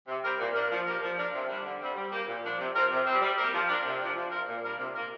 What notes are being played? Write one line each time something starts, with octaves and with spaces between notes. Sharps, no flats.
C3
G3 C4 G4 A#4
A#2
A#3 D4 A#4
F3
A#3 G4 A#4
F3
D4 A#4
C3
G3 D4
D3
G3 C4
G3
A#3 G4
A#2
F3 D4
C3
F3 C4 A#4
C3
G3 C4
G3
A#3 G4 A#4
F3
D4 A#4
C3
F3 D4
F3
C4 F4 A#4
A#2
G3 D4 A#4
C3
A#3 F4 A#4